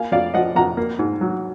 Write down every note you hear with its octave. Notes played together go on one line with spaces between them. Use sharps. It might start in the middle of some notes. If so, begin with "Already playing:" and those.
Already playing: A#3 F5 G#5
F2 D5 F5
F3 D#5 F#5
F2 F#5 A#5
A#3
G#2
F#3